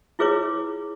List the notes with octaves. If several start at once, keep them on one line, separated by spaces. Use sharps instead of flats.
E4 F4 G#4 B4 C#5 D6